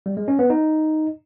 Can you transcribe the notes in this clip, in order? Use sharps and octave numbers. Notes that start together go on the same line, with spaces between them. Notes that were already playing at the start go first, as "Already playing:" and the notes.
G3
G#3
C#4
B3
D#4